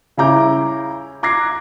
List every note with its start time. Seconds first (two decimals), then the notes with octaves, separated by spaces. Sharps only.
0.17 C#3 C#4 E4 A#5 D6 G6
1.23 A#5 D6 F#6 G#6 A#6 C7